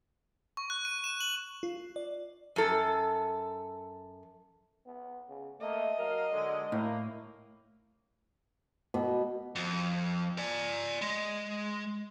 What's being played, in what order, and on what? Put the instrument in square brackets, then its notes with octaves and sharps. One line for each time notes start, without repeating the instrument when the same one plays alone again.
[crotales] C#6
F#6
D#7
E7
F#7
[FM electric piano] F4
D5
[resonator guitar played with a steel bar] F#2 A4
[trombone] B3
C#3
[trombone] A3 [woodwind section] A#3 [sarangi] D#5
[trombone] F#3 [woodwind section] A#4 F5
[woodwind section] D3 G#3
[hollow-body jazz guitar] A2 [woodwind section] A#3
[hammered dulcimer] B2
[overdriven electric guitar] F2
D5 G#5
G#3